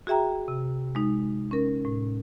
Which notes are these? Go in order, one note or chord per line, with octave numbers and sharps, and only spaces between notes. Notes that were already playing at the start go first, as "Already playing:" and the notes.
F#4 G#4 E5 G5 A#5
C3
G#3 D#4
C#4 A#4
A2